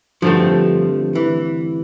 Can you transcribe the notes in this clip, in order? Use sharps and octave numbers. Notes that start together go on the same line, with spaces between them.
G2 D3 F3 A3 C4
E3